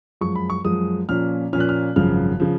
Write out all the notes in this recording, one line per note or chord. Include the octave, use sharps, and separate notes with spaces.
F#2 F3 G#3 C#6
B5
C#6
F#2 F3 G#3 D#6
A#2 F3 A#3 C#4 F6
A#2 F3 A#3 C#4 F6
F#6
F6
G#1 F#2 C#3 F3 F6
C#3 F3